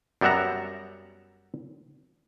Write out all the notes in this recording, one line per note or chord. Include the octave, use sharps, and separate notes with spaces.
F#2 G3 B3 E5 F#5 A#5